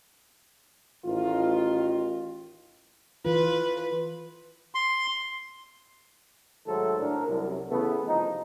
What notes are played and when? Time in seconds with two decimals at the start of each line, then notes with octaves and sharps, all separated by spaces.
1.05 A1 D#3 F4
3.25 E3 F4 B4
4.75 C6
6.67 G#2 D#3 F#3 A3 A4 C5
6.99 A2 D4 A#4
7.27 C2 F#2
7.69 C#3 E3 A3 B3
8.07 C2 F2 F3 D#4